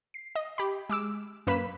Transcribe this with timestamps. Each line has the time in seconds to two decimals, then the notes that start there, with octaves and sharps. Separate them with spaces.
0.14 C7
0.35 D#5
0.58 G4 B5
0.89 G#3 D6 E6
1.47 F#2 A#3 B4 B5 B6 E7